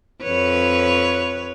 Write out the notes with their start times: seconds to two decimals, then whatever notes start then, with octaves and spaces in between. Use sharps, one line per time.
0.23 F2 B4 C#5